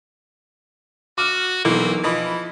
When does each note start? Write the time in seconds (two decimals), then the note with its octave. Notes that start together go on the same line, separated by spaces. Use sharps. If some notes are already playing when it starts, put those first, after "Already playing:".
1.18 F#4 D6 F6
1.65 B1 E3 A#3
2.04 E3 F3 D#5 B5